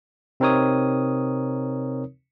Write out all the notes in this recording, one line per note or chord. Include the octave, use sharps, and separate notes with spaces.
C3 C4 D#4 A#4 C#5 D#6